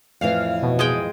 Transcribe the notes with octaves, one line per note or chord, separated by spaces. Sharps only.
F2 A2 E3 F5
B2
G#3 G#4 G5